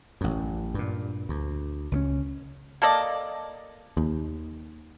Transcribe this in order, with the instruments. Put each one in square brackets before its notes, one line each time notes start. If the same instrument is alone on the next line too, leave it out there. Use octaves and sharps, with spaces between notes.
[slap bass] A1 F#2
G2 A#2
D2
C#2 E3 C#4
[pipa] A#3 A4 D5 D#5
[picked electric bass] D#2